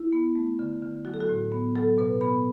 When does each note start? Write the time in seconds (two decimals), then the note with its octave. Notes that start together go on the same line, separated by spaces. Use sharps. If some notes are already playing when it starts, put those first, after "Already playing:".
Already playing: E4
0.12 B3
0.35 A3
0.59 D3
0.83 D3
1.05 F#3 F#4
1.14 A4
1.20 F#4
1.29 A2
1.52 B3
1.76 F#3 A4
1.98 B2 B4
2.21 B3 B5